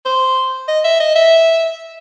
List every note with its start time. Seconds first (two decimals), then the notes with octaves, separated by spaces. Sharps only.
0.05 C5
0.68 D#5
0.84 E5
1.00 D#5
1.15 E5